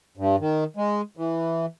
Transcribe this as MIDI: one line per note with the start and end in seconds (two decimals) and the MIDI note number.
0.17 0.36 43
0.40 0.64 51
0.77 1.01 56
1.17 1.66 52